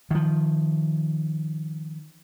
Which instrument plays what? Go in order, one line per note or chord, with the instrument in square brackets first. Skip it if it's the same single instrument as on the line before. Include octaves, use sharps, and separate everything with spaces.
[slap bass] D#3 F3